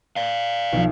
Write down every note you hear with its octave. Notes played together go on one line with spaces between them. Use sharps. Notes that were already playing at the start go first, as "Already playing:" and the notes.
D5 F5
B1 F3